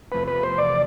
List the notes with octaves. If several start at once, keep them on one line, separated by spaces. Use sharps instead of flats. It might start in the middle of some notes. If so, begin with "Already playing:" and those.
E2 C3 F3 A3 B4
B4
C5
D5